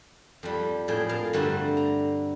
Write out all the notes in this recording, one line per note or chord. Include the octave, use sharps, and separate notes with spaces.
F2 G3
A2 F3 G#4 G5
A#4 F5 A5
G2 D3 G3 A3 C4 F#4
A#5